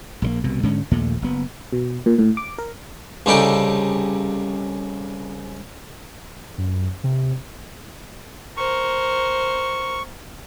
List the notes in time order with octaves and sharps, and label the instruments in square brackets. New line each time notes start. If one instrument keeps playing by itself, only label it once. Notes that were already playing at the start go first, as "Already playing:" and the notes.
[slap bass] A#1 C#3 A#3
C2 B2
G#2 D3 G#3 C#4
A#1 D#2 A#2 A3
F#1 B3
[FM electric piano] B2
A#2
A2
D6
A#4
[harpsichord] C2 C#3 G3 D#4 A4 G5
[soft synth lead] F#2
C3
[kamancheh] A#4 C5 [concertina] C#6